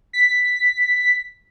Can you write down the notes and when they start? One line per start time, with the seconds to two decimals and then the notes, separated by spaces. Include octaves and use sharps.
0.13 B6